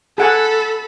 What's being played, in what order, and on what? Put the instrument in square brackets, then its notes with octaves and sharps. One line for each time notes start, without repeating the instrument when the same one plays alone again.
[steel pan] G#4 F#5 G#5 [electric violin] A4 B5